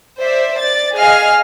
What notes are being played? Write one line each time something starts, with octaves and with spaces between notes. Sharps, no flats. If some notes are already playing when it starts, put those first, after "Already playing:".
C5 D5 E5
D5 A6
G#4 D#5 F5 G#5 F6